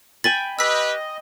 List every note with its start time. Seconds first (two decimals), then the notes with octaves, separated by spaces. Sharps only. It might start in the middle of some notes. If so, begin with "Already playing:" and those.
0.24 G5 G#5 B5 A6
0.59 G4 B4 D#5 E6 B6